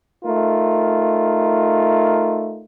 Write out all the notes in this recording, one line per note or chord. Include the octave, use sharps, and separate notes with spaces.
A3 D#4 F4 A#4